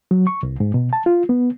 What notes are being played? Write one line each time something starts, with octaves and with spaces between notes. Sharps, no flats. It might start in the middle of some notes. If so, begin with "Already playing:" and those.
F#3
C#6
C2
G#2
B2
A5
F4
B3